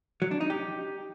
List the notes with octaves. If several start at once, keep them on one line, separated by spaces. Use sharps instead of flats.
F#3
D4
D#4
G4